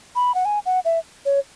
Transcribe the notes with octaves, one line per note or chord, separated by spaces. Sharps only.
B5
F#5
G#5
F#5
E5
C#5